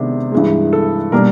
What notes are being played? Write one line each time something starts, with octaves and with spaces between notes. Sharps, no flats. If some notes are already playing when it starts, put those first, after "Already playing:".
Already playing: C3 D#3 G#3 B3 D4
G2 E3 G#3
A4
B2 G3 A#3 D4 A#4